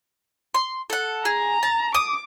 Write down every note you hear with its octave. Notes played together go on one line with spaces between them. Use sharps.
C6
A4 F#5
G#4 A#5
A5
D6 D#6